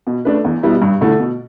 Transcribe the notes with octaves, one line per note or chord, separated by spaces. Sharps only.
B2
A3 D4 B4
E2
B2 G3 B3 E4
G2
D3 A3 E4
B2